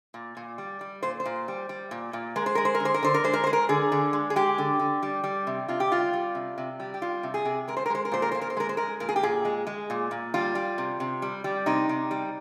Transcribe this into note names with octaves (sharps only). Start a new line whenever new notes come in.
A#2
A#2
G3
G3
A#2 C5
C5
A#2
G3
G3
A#2
A#2
G#3 A#4
C5
G#3 A#4
C5
A#4
D3
C5
A#4
D3 C5
A#4
G#3 C5
A#4
G#3 C5
A#4
D3 G#4
D3
G#3
G#4
G#3 G4
D3
D3
G3
G3
C3
C3 F4
G4
G3 F4
G3
C3
C3
G3
G4
G3 F4
C3
G#4
C3
G#3 A#4
C5
A#4
G#3 C5
A#4
A#2 C5
A#4
A#2 C5
A#4
C5
G#3 A#4
C5
G#3 A#4
A#2 A#4
G#4
G4
A#2 G#4
G#3
G#3
A#2
A#2
G3 F4
G3
C3
C3
G3
G3
C3 D#4
C3
G3